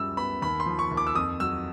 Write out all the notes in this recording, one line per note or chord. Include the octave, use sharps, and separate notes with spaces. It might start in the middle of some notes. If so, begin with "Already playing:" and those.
Already playing: F#2 F3 G3 E6
B3 B5
D#2 B5
C6
F3
C#6
D#2
D6
E6
F2 D#6
F#3 E6